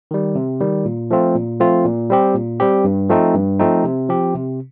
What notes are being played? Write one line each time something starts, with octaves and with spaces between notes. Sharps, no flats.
D#3 G3
C3
D#3 G3
A#2
F3 A3 C4 F4
A#2
F3 A3 C4 F4
A#2
G3 C4 G4
A#2
G3 C4 G4
G2
F3 A3 C4 D#4
G2
F3 A3 C4 D#4
C3
F3 C4 G4
C3